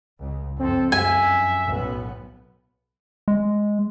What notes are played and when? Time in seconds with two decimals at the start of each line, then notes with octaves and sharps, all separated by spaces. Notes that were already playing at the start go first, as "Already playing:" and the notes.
0.19 C#2
0.59 F2 C4 A4
0.92 F#2 E5 G#5
1.66 B1 A2 B3
3.28 G#3